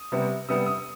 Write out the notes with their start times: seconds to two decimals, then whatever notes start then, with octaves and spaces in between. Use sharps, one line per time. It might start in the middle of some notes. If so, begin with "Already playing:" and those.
Already playing: D#6
0.12 C3 G3 B3
0.48 C3 G3 B3 D#6
0.66 D#6